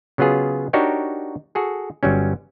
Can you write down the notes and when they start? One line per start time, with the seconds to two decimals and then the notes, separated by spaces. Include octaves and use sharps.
0.18 C#3 F#3 B3 F4 G#4
0.73 D4 D#4 F#4 G4 A#4 C#5
1.55 F#4 G#4 A4
2.03 G1 F#3 G3 C#4